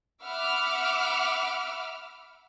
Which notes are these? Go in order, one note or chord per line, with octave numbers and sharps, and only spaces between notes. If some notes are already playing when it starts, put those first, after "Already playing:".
E5 F#5 B5 D6 E6 F6